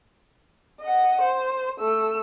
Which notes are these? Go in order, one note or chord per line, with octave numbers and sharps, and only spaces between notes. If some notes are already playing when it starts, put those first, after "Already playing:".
D#5 F#5
C5
A3 E6